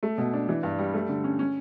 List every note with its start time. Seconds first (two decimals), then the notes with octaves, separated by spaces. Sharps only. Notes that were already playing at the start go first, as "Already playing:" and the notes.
0.03 A3
0.18 B2
0.33 D4
0.48 E3
0.63 G2
0.79 G3
0.94 A3
1.09 D3
1.24 C#4
1.39 C#4